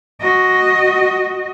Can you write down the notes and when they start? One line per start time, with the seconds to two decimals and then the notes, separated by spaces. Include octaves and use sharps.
0.19 F#4 D#5